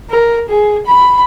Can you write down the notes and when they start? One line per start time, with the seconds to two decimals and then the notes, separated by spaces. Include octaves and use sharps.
0.11 A#4
0.49 G#4
0.86 B5